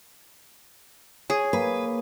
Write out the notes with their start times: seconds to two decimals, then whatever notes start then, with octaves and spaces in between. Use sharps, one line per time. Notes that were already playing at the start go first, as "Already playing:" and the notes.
1.30 G#4 C#5 D#6
1.53 A#3 B4